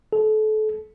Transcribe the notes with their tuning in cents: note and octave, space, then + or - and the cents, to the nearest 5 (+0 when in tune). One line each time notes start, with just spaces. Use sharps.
A4 -30